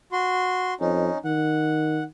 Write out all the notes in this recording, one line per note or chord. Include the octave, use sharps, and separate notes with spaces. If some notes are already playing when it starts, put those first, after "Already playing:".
F#4 C6
F2 C#4 D#4
D#3 F#5